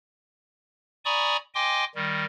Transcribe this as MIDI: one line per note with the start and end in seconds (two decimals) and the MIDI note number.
1.05 1.37 74
1.05 1.37 80
1.05 1.37 82
1.05 1.37 83
1.05 1.37 85
1.05 1.37 87
1.55 1.84 75
1.55 1.84 79
1.55 1.84 80
1.55 1.84 84
1.55 1.84 86
1.95 2.25 51
1.95 2.25 55